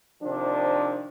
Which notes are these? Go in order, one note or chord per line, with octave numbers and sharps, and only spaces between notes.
C3 D#3 F3 D4